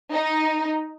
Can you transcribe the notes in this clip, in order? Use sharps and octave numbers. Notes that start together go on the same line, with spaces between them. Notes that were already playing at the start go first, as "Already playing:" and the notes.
D#4